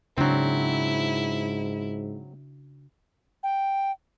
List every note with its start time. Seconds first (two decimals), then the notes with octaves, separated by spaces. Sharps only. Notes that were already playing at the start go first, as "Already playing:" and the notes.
0.18 G#2 C#3 F#3 C4 D4 E4 F#4
3.43 G5